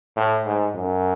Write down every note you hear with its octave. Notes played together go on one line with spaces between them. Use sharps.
A2
G#2
F#2